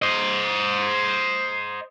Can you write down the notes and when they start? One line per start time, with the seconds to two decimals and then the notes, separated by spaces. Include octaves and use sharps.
0.02 C5 D#5